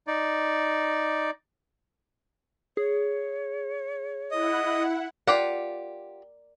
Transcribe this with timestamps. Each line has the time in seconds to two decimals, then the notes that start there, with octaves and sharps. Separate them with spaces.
0.07 D#4 D5
2.77 G#4 C#5
4.31 E4 D#5 F#5
5.27 F4 G4 A#4 D5 F#5